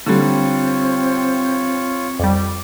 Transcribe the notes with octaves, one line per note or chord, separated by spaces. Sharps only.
D3 G3 C4 F4 C#5
F2 G3 D5